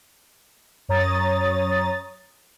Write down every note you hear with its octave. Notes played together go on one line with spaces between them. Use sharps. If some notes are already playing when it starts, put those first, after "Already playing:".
F#2 C#5 A#5 D#6 A6